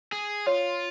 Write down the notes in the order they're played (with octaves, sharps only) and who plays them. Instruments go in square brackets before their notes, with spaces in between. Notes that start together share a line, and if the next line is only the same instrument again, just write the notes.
[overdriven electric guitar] G#4
[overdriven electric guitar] F4 [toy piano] C#5